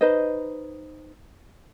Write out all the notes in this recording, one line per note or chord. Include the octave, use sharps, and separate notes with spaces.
D#4 B4 C5 D#5